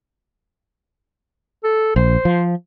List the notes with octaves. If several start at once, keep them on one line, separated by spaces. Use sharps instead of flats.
A4
A#1 C5
F3